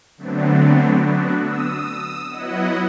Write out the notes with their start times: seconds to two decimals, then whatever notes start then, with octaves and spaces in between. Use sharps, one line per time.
0.17 D3 F#3 A3 B3 C4 D4
1.01 B3 D4 F#4
1.39 D#6 E6
2.29 F#3 B3 E4 D#5 F#5